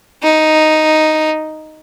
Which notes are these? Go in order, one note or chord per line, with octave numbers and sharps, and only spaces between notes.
D#4